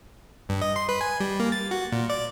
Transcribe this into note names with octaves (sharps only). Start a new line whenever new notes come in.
G2
D#5
C6
B4
G#5
G3
A#3
A6
F#4
A#2
D5